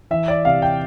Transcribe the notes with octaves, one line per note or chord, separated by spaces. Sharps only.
E3 E5
D5
C3 F5
G5